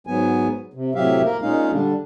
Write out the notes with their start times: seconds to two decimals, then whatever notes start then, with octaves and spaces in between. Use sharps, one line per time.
0.07 G#2 F#3 B3 G#5
0.74 C3
0.95 A2 C3 F#3 G4 E5 F5
1.24 A#3 A#4
1.42 A#2 G#3 C#4 D#4 F5
1.72 D3 G3 D4